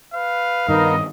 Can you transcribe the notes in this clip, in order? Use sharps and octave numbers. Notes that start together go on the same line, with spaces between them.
B4 F5
G2 D#3 B3 D#4 A#4 D#5